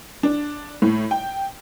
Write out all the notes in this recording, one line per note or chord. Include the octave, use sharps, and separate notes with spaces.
D4
A2
G5